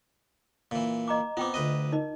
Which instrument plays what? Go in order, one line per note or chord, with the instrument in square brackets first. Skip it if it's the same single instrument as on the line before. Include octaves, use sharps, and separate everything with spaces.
[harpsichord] A#2 E3
[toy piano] D#5 A#5 D6
[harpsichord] B3 C4 [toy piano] F4 G5 D6
[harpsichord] D2 B4 D#5
[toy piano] D#4 A#4 D#5